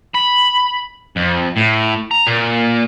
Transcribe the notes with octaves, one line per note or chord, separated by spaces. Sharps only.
B5
F2
A2
A#5
A#2